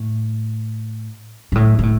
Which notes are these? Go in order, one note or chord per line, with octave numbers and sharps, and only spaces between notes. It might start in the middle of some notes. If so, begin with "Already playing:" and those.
Already playing: A2
G#2
A2
A#2
A2